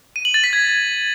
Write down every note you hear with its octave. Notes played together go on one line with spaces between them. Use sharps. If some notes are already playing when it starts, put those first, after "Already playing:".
D#7
F#7
A6
B6
G#6